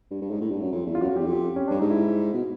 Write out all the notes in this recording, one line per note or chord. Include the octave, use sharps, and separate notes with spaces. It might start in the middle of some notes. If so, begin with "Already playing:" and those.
G2
G2
G#2
A2
G2
F#2
F2
E2
F4
F#2 F#4
F2
E2 G4
F2
G4
C#4
G2 D4
G#2 D#4
E4
B2